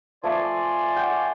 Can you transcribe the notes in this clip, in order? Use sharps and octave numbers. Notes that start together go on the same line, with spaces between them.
F3 A3 D5 G#5 C6 D6
F#5 G5